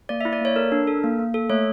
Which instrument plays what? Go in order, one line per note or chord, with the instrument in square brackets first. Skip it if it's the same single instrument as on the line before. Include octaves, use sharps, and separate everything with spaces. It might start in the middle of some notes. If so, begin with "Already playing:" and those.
[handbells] A#3 D5
E5
E4
D5
A#3 C#5
A4 A#4
D4
A4
A#3
A#3
A4
A3 C#5